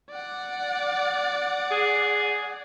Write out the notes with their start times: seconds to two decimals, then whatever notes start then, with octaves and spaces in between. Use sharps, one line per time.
0.11 D5 F#5
1.71 G#4